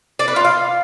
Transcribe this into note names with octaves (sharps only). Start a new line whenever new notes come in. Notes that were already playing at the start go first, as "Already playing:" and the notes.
D5
B4
F4
F5